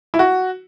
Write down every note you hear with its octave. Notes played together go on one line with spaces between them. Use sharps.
E4
F#4